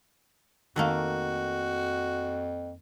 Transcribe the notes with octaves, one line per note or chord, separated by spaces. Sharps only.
F2 D#3 A3 A#3 F#4